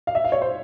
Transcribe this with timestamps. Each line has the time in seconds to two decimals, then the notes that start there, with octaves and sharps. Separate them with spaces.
0.07 F5
0.15 E5
0.24 F5
0.32 C#5
0.42 C5